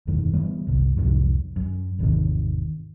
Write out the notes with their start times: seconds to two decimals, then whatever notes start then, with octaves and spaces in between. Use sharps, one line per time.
0.07 E1 F#2 D#3
0.33 E3 G3 B3
0.67 F#1 C2
0.97 C2 F2 G#2 F#3
1.56 F#2
1.99 G#1 E2 C3 D#3